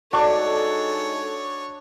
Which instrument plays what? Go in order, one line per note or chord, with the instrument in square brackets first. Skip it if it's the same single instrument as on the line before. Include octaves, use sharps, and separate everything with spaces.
[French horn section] G#3 D#4 A4 [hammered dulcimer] D4 [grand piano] F#4 C#6 D6 [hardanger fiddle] C#5